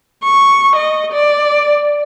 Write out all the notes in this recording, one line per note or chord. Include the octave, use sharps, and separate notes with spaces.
C#6
D#5
D5